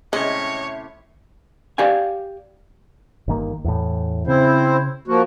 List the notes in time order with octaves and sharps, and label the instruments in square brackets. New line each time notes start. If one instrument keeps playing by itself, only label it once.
[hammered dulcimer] A2 C3 C#4 [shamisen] G#3 [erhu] C#5 [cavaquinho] D#5
[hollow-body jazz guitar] G4 D5 F5 G#5
[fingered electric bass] G1 D#3 A#3
E2 A2
[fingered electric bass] C#3 [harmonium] C4 E4 C5
[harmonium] F3 A#3 F#4